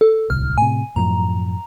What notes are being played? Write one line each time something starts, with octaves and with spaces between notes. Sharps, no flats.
A4
D1 C2 F6
A2 C3 G#5
F#2 A2 F3 A#5